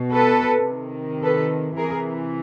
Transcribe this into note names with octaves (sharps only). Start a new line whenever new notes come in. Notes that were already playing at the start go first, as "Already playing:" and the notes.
Already playing: B2
A4 B4
C3 D#3
A4 B4
C3 E3 G#4 A#4